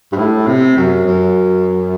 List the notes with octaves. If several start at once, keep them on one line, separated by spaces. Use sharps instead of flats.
G2
A2
C3
F#2
F#2